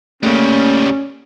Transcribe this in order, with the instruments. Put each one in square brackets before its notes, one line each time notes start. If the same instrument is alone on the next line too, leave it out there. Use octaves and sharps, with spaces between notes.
[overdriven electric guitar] C#3 G3 [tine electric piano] A3 A#3 [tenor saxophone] C#4